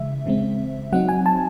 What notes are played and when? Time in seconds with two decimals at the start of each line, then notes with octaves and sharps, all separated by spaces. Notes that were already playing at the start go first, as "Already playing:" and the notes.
Already playing: C#3 E3 G#3 E5
0.26 C#3 E3 G#3 C4
0.92 F#3 C4 D#4 F#5
1.09 G#5
1.26 A5